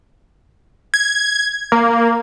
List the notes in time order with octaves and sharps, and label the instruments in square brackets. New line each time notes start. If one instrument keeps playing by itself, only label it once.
[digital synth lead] G#6
A#3